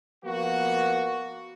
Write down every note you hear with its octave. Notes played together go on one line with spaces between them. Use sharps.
F3 A#3 B3 F#4